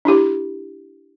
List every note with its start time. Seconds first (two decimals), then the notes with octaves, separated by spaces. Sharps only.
0.05 D4 E4 G4